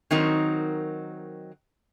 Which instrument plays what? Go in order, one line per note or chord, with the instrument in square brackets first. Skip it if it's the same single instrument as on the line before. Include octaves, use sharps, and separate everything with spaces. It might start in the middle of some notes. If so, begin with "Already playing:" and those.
[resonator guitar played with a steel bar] D#3 F#3 C4 D#4 A#4